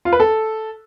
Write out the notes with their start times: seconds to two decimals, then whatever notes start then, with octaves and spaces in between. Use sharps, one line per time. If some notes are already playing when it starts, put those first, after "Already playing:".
0.05 F4
0.13 B4
0.20 A4